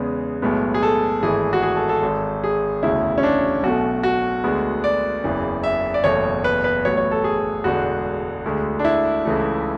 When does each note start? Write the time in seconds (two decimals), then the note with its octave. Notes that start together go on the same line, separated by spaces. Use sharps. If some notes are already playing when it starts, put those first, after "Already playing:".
Already playing: E2 C#3 G#3 B3
0.42 B1 A2 G#3 B3
0.74 G#4
0.83 A4
1.23 G#1 G#2 E3 A3 G#4
1.53 F#4
1.62 G#4
1.76 A4
1.89 A4
2.03 G#1 G#2 G#3
2.44 G#4
2.83 E1 D2 C#3 E4
3.18 C#4
3.23 D4
3.63 B1 B2 A3 F#4
4.03 F#4
4.44 D2 D3 G#3 B3
4.84 D5
5.24 F#1 E2 C#3 E3
5.64 E5
5.94 D5
6.04 F#1 E2 B2 A3 C#5
6.44 B4
6.64 B4
6.85 A1 A2 F#3 B3 C#5
6.97 C#5
7.11 A4
7.24 G#4
7.64 E1 E2 D3 G#3 F#4
8.46 D2 D3 G#3
8.79 D4
8.85 E4
9.25 C#2 C#3 E3 A3